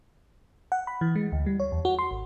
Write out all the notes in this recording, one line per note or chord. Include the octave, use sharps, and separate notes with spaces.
F#5
B5
E3
G#3
D2
G3
C#5
E2
F#4
C6
G#1